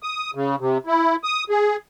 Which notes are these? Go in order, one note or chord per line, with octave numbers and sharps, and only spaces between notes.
D#6
C#3
C3
E4
D#6
G#4